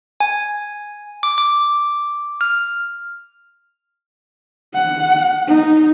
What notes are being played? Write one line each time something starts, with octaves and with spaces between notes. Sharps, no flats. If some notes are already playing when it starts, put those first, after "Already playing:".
G#5
D6
D6
F6
F#5
D#4